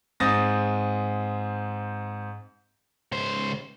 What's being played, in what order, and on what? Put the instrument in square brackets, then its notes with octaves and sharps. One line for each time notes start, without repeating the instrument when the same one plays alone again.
[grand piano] G#2 C4 D#6 A6 A#6
[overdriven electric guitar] C#2 C5